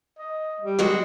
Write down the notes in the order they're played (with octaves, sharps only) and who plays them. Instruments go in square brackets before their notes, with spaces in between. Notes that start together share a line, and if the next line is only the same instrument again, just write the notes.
[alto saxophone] D#5
G3
[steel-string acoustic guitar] F#3 G#3 F#4